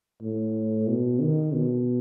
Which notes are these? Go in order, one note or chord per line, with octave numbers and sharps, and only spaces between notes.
A2
B2
D#3
B2